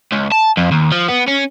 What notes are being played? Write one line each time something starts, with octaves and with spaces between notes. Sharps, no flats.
C#2
A5
F2
D#2
F3
B3
C#4